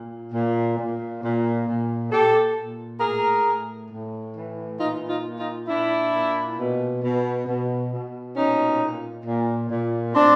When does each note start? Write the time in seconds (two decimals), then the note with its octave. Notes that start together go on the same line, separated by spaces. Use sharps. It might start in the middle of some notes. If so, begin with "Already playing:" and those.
Already playing: A#2
0.33 A#2
0.78 A#2
1.22 A#2
1.67 A#2
2.11 A#2 G4 A4
2.57 A#2
3.00 A2 G#4 A#4
3.46 A2
3.90 A2
4.35 E3
4.79 A#2 D#4 F4
5.09 D#4 F4
5.25 A#2
5.39 D#4 F4
5.68 A#2 D4 E4
6.13 A#2
6.57 B2
7.03 B2
7.47 B2
7.92 B2
8.36 A#2 C#4 D#4
8.81 A#2
9.25 A#2
9.70 A#2
10.14 A2 C4 D4